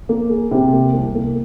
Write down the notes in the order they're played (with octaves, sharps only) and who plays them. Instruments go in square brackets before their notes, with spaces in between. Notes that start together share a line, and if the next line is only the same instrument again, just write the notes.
[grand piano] A#3
G#4
C3
A#3
C2
A#3